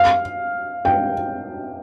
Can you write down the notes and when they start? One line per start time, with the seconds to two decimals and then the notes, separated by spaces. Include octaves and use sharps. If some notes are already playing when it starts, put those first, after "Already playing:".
Already playing: F5
0.85 G5